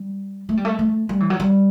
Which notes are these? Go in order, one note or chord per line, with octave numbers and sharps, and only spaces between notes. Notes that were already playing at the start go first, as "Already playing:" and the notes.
Already playing: G3
A3
G3
A3
A3
G3
E3
F#3
G3